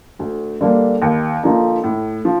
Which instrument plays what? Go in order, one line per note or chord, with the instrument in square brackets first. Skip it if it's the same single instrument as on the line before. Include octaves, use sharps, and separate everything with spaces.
[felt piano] D2
D3 G3 A#3 D4
D#2
D3 F3 A#3 D#4
A2
F3